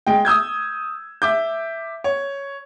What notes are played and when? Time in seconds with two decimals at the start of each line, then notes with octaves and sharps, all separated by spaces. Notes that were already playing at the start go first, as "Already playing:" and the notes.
0.07 G#3 G5
0.25 D#6 E6 G6 G#6
1.22 E5 D6 G6
2.04 C#5